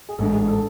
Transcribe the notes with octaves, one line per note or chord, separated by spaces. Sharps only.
G#4
A1 G#2 G#3 D4 A4
G#4
A4